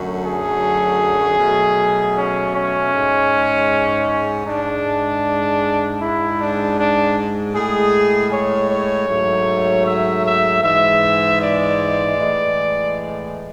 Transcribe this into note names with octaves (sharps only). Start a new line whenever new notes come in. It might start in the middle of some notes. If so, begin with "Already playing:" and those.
Already playing: F#2 D3 F#3 A3
G#4
B2 F#3 A3
C#4
C#4
G#2 G#3
G#2 G#3 D4
G#2 G#3 E4
D4
D4
A2 G#3 G#4
C#5
C#5
G#2 F#3 A3
E5
E5
G#2 E3 G#3 E5
D5
A2 E3 G#3